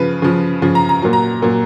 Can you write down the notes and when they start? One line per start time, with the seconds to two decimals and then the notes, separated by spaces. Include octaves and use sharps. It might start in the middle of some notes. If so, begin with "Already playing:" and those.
Already playing: C#3 F3 B4
0.22 C#3 F3
0.62 C#3 F3
0.75 A#5
0.89 A#5
1.02 A#2 F#3
1.13 A#5
1.42 A#2 F#3